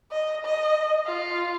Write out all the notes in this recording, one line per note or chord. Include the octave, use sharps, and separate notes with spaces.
D#5
D#5
F4